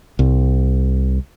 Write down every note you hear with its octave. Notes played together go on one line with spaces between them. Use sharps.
C2